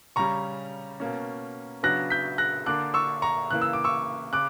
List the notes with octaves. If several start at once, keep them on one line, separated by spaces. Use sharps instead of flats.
C#3 G3 C#4 A#5 C#6
B2 A#3 C#4
C#3 F#3 B3 D4 F#6 A#6
G6 B6
F#6 A#6
D3 A#3 D4 D6 F#6
C#6 E6
A#5 C#6
C#3 E3 A#3 F#6
E6
D6
C#6 E6
C#3 D6 F#6